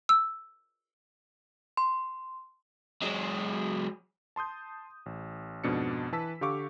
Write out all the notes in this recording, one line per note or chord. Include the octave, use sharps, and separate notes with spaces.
E6
C6
F#3 G#3
A5 C6 D#6 G6
A1
F2 G#2 B2 D4 C#7
E3 B4 A5 E6 B6
D3 G4 F5 C#6 D6